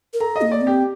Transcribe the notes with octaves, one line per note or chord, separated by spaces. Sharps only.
A#4
A4 A#5
D#5
A#3
D5
C4
G4